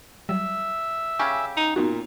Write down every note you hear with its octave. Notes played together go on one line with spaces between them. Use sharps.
F#3 G3 E5
C#3 C#4 G4 C#6 F6 G#6
D#4
A#2 B3 D#4 F#4